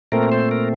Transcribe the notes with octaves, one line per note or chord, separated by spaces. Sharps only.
A#2 A3 C4 A#4
C5
A#4